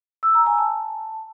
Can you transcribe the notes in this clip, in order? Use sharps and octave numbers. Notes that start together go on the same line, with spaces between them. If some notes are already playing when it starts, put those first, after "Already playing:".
E6
A#5
G#5
A5